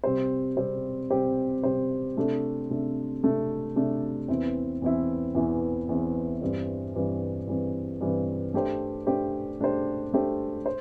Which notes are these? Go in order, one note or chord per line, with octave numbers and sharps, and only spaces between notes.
C3 G3 C4 G4 C5
C3 G3 C4 G4 C5
C3 G3 C4 G4 C5
C3 G3 C4 G4 C5
C3 A3 D4 A4
C3 A3 D4 A4
C3 A3 D4 A4
C3 A3 D4 A4
E2 E3 C4 E4
E2 E3 C4 E4
E2 E3 C4 E4
E2 E3 C4 E4
G2 E3 C4
G2 E3 C4
G2 E3 C4
G2 E3 C4
A3 D4 G4 C5
A3 D4 G4 C5
A3 D4 G4 C5
A3 D4 G4 C5
C5